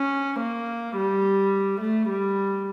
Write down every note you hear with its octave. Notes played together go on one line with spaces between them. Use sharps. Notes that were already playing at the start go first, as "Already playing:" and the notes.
Already playing: C#4
A#3
G3
A3
G3